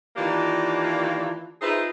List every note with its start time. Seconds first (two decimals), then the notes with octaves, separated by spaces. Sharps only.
0.17 D#3 E3 A#3 D4 F4 G4
1.62 D#4 F4 G#4 B4 C5 E5